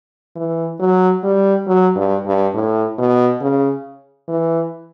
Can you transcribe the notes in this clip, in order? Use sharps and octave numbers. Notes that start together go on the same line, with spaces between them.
E3
F#3
G3
F#3
G2
G2
A2
B2
C#3
E3